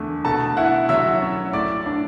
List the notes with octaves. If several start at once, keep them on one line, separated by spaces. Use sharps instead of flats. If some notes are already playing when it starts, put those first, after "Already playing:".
Already playing: E2 D3 A3
B2 A4 A5
E4 F#5
F#3 E5 E6
C#4
A2 D5 D6
D4